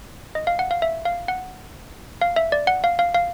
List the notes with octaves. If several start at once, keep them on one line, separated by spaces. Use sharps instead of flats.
D#5
F5
F#5
F5
E5
F5
F#5
F5
E5
D5
F#5
F5
F5
F5